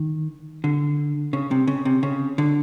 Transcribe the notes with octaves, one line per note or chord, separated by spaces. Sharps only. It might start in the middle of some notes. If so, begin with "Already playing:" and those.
Already playing: D#3
D3
C#3
C3
C#3
C3
C#3
D3